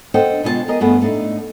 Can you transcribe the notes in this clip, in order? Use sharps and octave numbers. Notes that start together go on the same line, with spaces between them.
D4 A4 C5 D#5 F#5 G5
B2 D3 G#3 F4 D5 A5
G#4 A#4 D#5
G2 F3 A3 B3 G#4 F#5
A2 A3 D4 D#4